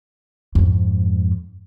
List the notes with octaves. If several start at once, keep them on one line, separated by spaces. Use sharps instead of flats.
F2 G#2